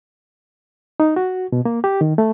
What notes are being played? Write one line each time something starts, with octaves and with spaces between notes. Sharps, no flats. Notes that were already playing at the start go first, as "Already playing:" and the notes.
D#4
F#4
B2
A#3
G4
D#3
A3